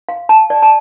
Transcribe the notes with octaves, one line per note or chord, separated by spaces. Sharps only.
F5
A5
D5
A5